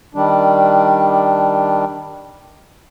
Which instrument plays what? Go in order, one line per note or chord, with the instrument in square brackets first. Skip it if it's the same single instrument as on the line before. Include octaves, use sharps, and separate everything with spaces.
[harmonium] D#3 G3 D4